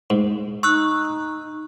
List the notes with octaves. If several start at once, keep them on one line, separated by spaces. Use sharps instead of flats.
G#2
D#4 C#6 E6 F#6